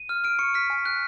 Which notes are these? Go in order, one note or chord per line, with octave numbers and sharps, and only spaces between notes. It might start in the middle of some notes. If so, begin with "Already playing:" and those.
Already playing: D#7
F6
F6 D7
C#6 C#7
F6 B6
G#5
F#6